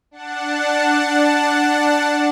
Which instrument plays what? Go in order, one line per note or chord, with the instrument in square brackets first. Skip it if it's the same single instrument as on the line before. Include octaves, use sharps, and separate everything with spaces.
[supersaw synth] D4 F#5 A5